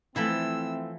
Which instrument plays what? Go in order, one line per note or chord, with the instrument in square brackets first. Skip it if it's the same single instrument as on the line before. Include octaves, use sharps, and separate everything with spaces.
[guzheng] E3 F3 B5 [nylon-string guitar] A3 E4 [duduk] C4 [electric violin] E6